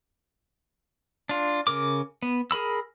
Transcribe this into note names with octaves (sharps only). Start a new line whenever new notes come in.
D4 F4
C#3 A#4 D6
B3
G#4 A#4 B5 E6